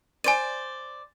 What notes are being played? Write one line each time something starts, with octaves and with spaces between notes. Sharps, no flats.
C5 D5 G#5 D#7